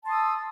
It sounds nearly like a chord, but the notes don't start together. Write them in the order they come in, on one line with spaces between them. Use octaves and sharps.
A5 C6 D#6 E6